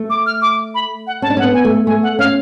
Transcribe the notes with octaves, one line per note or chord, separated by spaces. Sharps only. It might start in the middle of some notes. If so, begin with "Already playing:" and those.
Already playing: A3
D6
F6
D6
B5
F#5
C#4 A5
D4
C#4 F#5
B3
G#5
A3
A3 G#5
F#5
C#4 F5